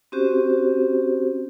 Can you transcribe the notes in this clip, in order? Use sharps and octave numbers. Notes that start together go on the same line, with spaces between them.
C4 C#4 F#4 G4 C5